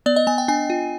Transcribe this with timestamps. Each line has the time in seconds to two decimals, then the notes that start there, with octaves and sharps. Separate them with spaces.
0.06 B3 D5
0.16 D#5
0.27 B3 G#5
0.38 G5
0.48 D4 G#5
0.70 F4